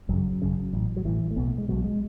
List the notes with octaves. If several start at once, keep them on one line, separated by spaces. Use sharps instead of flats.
G#1 F#2 C#3 F#3
G#1 F#2 C#3
A1 A2
F#3
A1 A2 E3
A3
B1 B2 B3
A3
G#3
B1 B2 F#3
G#3